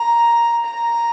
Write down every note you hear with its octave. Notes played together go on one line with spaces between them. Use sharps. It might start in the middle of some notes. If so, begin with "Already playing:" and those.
Already playing: A#5
A#5